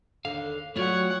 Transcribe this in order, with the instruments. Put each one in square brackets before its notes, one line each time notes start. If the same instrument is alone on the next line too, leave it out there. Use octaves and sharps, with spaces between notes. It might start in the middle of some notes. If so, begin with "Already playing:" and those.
[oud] D#2 D3 [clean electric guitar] F5
[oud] F#3 G3 [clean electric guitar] A3 F4 D5 [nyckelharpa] C#5 F#5